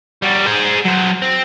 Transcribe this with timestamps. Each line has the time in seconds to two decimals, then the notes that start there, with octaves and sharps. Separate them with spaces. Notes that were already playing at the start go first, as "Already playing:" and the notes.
0.22 G3 F#4
0.46 G#4 C5
0.85 F#3 C5
1.22 C4